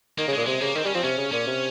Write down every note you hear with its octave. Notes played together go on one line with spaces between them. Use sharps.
D#3 A#3
C#3
A#2 G#3
C3 G#3
C#3 A#3
D#3 C4
G3 C#4
F3 C4
C3 C#4
C#3
A#2 C#4
C3